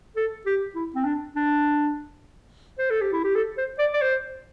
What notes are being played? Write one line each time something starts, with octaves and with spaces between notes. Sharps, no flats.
A4
G4
E4
C4
D4
D4
C5
A4
G4
E4
G4
A4
C5
D5
D5
C5